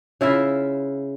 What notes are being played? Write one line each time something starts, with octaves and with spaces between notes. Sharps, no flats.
C#3 E4 F4 E5